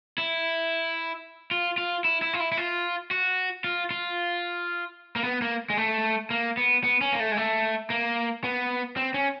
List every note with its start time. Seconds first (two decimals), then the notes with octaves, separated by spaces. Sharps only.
0.18 E4
1.51 F4
1.78 F4
2.05 E4
2.22 E4
2.33 F4
2.40 E4
2.52 E4
2.57 F4
3.11 F#4
3.64 F4
3.91 F4
5.16 A#3
5.24 B3
5.42 A#3
5.70 G#3
5.77 A3
6.30 A#3
6.57 B3
6.84 B3
7.01 C#4
7.13 A#3
7.20 A3
7.32 G#3
7.37 A3
7.90 A#3
8.44 B3
8.96 C4
9.14 C#4